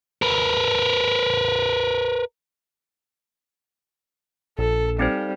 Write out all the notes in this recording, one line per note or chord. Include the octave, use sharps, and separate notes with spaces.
A#4 B4
A#1 A4
G3 C4 D#4 C5